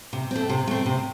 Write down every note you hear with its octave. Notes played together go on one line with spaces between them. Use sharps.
C3
A3 C4
C3
A3 C4
C3